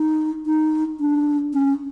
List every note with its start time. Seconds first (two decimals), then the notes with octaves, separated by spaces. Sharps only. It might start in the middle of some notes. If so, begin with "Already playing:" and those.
Already playing: D#4
0.46 D#4
1.00 D4
1.54 C#4